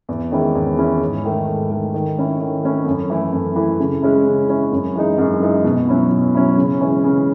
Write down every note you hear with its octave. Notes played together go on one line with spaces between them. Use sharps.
E2
D#3 G#3 C#4 E4
E2
D#3 G#3 C#4 E4
G#2
D#3 A3
G#2
D#3 A3
D#3
A3 C#4 E4
D#3
A3 C#4 E4
F#2
E3 A3 E4
F#2
E3 A3 E4
C#3
G#3 C#4 E4
C#3
G#3 C#4 E4
F#2
E3 G#3 D#4
F#2
E3 G#3 D#4
B2
F#3 C#4 E4
B2
F#3 C#4 E4
C#3
E3 G#3 C#4
C#3